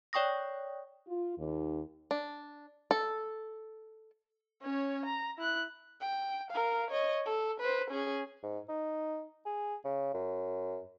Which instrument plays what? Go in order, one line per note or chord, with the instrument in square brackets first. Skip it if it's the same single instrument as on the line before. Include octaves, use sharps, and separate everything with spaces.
[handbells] C#5 D5 G5 C#6 D#6 A#6
[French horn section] F4
D#2
[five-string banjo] D4
A4
[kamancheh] C#4 C#5
A#5
E4 F#6
G5
A#4 F5
C#5 D#5
A4
B4 C5
C#4 G#4
[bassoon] G#2
D#4
G#4
C#3
F#2